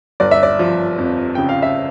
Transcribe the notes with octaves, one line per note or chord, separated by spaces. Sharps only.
G1 D5
E5
D5
F3
F2
C#3 G5
F5
E5